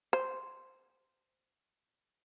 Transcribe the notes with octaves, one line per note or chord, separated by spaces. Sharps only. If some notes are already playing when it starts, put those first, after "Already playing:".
C5